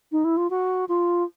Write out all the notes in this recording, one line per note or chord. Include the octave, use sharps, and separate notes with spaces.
D#4
E4
F4
F#4
F4